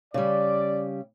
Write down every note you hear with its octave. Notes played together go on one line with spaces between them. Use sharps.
C#3 G3 D5